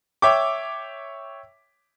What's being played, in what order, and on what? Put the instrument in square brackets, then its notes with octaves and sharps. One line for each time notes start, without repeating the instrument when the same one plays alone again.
[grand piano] C#5 E5 G5 D6